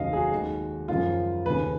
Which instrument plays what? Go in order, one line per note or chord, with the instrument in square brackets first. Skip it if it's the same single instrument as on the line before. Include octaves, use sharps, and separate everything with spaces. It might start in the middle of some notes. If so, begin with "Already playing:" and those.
Already playing: [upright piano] F1 D#2 C#3 F#3 D#5 F5
G#4
F#4
D#2 D#3 G#3
G#1 F#2 C#3 F3 F4
F1 D#2 C#3 B4